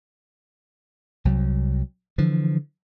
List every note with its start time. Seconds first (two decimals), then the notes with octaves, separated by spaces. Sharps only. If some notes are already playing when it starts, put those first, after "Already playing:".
1.25 C2 F#3
2.18 D3 E3 F3